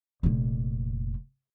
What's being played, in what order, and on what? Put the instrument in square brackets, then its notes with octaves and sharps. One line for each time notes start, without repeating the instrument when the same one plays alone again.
[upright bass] F1 A#2